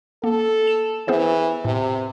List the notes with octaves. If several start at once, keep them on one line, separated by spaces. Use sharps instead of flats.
A#3 A4
E7
E3 B3 G#4 C5
A2 C3